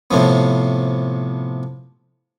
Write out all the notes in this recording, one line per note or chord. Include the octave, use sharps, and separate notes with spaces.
A2 C3 F3 B3